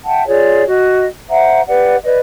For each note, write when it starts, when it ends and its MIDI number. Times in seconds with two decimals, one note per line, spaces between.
0.04 0.25 76
0.04 0.25 78
0.04 0.25 79
0.04 0.25 81
0.27 0.64 65
0.27 0.64 68
0.27 0.64 73
0.27 0.64 74
0.66 1.03 66
0.66 1.03 75
1.28 1.61 72
1.28 1.61 76
1.28 1.61 78
1.28 1.61 82
1.67 1.95 67
1.67 1.95 71
1.67 1.95 74
1.67 1.95 78
2.03 2.18 71
2.03 2.18 74
2.03 2.18 75